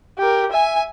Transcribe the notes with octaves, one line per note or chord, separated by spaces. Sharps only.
G4 A#4
E5 G#5